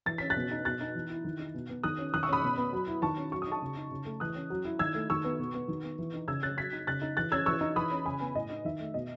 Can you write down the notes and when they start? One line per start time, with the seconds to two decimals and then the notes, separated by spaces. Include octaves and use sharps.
0.06 E3 A6
0.18 C#4 B6
0.30 F#6 A6
0.36 B2
0.51 D#4
0.65 B2 F#6 A6
0.81 D#4
0.95 E3
1.10 E4
1.24 D#3
1.39 D#4
1.54 B2
1.70 B3
1.83 D#3 D#6 F#6
1.98 C#4
2.14 D#3 D#6 F#6
2.23 C#6 E6
2.29 C#4 B5 D#6
2.43 B2
2.57 B3
2.72 F#3
2.87 E4
3.02 D#3 A5 C#6
3.17 C#4
3.32 F#3 C#6
3.42 D#6
3.47 D#4 A5 C#6
3.62 C#3
3.77 D#4
3.91 C#3
4.06 A3
4.20 E3 D#6 F#6
4.35 C#4
4.50 F#3
4.65 E4
4.79 D#3 E6 G#6
4.95 A3
5.10 D#3 C#6 E6
5.25 B3
5.39 B2
5.54 B3
5.68 D#3
5.84 B3
5.98 E3
6.13 D#4
6.28 C#3 E6 G#6
6.43 C#4 F#6 A6
6.58 F#3 G#6 B6
6.73 D#4
6.87 C#3 F#6 A6
7.02 D#4
7.17 E3 F#6 A6
7.32 C#4 E6 G#6
7.46 E3 C#6 E6
7.61 D#4
7.76 E3 B5 D#6
7.91 C#4
8.06 C#3 G#5 B5
8.20 B3
8.35 A2 D#5
8.50 D#4
8.65 D#3 E5
8.80 A3
8.94 B2 D#5